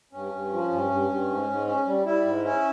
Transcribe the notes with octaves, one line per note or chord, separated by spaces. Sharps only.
G2 C#4
G2
F3
G2
G2
G2
G#2
G#2
C#4
G3
G3 E4
G#2
C#4 E4